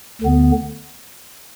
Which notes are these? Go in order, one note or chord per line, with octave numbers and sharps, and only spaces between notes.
D2 D3 B3